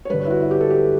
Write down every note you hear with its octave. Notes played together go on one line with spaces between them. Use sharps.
C#5
G2 D3 B4
C#5
E4
F#4
E4
G4
A4
G4